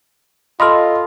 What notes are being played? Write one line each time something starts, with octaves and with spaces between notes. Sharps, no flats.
F4 A4 D#5 B5 C6 F6